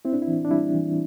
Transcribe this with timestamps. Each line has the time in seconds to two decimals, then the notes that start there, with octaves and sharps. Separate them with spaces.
0.05 C4 E4
0.13 D4
0.22 E4
0.28 E3
0.45 D4
0.51 G3 E4
0.74 E3